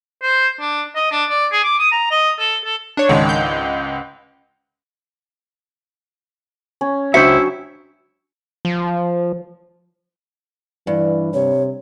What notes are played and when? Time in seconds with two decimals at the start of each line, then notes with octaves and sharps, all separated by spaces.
0.23 C5
0.60 D4
0.96 D#5
1.12 D4
1.29 D5
1.52 G#4
1.64 D6
1.79 D#6
1.92 A#5
2.11 D#5
2.39 A4
2.65 A4
2.97 D4 C#5
3.09 C#2 G#2 D#3 G#3
3.29 G6
6.81 C#4
7.14 C#2 F#3 D4 E4 C5 E5 C#7
8.65 F3
10.87 G2 E3
11.34 C3 C#5